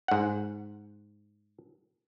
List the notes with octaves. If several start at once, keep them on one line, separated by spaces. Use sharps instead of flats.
G#2 F#5